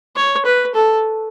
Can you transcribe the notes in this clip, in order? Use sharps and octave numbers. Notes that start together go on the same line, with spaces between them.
C#5
B4
A4